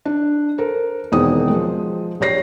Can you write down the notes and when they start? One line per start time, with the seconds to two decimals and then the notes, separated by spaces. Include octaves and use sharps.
0.05 D4
0.58 A4 A#4 C5
1.12 E1 E2 D#3 C4 F#4 D#6
1.50 F3 G#3
2.20 A#1 G4 C#5 A#6 C7